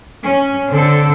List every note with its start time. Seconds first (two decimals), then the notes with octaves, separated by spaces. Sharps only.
0.23 C#4
0.70 D3 C4 A4